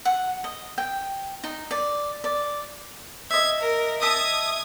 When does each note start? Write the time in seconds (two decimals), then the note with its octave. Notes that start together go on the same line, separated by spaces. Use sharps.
0.05 F#5
0.44 D#5
0.78 G5
1.44 D#4
1.71 D5
2.24 D5
3.31 D#5 E5 G#6
3.61 A#4
4.02 D#5 E5 A5 D#6 G#6